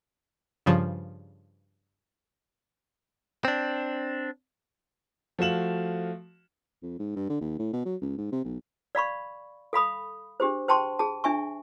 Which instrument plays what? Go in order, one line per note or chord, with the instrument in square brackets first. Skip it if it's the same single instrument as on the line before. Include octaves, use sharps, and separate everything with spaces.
[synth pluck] G2 C#3 F3
[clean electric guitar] C4 D4
[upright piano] F3 A3 F#4 F5 E7 F#7
[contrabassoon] F2
G#2
G2
D3
D#2
A2
B2
F#3
C#2
G#2
C3
B1
[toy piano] D5 F5 B5 C#6
A4 F5 B5 D#6
D4 G4 G#4 C5
C5 G5 A5 C6 C#6
G#4 A5
D4 E5 G#5 C#6